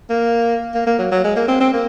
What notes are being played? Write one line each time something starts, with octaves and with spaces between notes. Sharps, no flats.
A#3
A#3
A#3
F#3
F#3
G#3
A#3
C4
C4
A#3